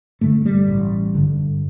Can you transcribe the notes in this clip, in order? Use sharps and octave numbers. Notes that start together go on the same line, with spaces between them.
G2 D3 A3
G3
A1
G2 D3